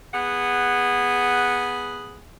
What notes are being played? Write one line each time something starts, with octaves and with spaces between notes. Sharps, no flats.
B3 G#4 F#5